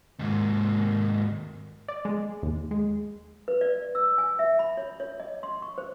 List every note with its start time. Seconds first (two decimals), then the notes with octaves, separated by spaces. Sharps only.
0.19 D#2 G#2
1.88 D5
2.05 G#3
2.43 D#2
2.71 G#3
3.48 B4
3.61 D5
3.95 E6
4.18 G#5
4.39 E5
4.59 B5
4.77 C#5
5.00 C#5
5.20 D#5
5.43 C6
5.62 C#6
5.78 C5